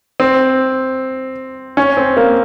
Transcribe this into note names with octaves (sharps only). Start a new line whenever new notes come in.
C4
C#4
C4
A#3